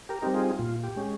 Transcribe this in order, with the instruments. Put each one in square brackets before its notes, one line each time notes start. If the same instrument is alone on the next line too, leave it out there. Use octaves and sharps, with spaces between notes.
[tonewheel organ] G4 A#4
G3 C4 D#4 G4
F4 G#4
A#2 F4
G4
G#3 C#4